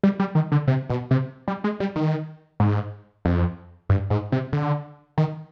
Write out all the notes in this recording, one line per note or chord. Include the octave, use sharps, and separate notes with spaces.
G3
G3
D#3
D3
C3
B2
C3
G3
G#3
G3
D#3
G#2
F2
G2
G#2
C3
D3
D#3